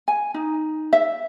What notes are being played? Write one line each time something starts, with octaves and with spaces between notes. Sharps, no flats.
G#5
D#4
E5